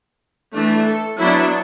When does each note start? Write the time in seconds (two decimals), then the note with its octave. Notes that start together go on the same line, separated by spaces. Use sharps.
0.54 E3 A3 D4
0.87 A4
1.20 F#3 B3 D4 E4